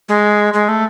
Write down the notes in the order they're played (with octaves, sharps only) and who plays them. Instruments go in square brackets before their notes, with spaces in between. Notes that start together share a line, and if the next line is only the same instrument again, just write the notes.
[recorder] G#3
G#3
A3